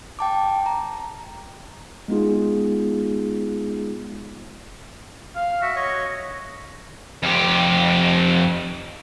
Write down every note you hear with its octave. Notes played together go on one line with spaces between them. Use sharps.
G5 A5 D6
A#5
G#3 B3 D#4 F4 G#4
F5
F#4 E5
C#5 D#5
F2 G4